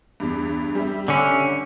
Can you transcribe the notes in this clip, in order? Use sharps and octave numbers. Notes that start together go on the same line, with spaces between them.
E2 G2
G3 G4 E5
D3 C#4